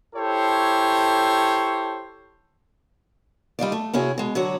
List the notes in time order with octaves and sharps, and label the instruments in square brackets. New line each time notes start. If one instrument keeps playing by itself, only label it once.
[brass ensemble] E4 G4 A4 C5 C#5
[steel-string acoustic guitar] G3 D#4 F4 D5
A3
C3 C#4 E4 F#4 G#4
B2 G#3
D3 F#3 F#4 C#5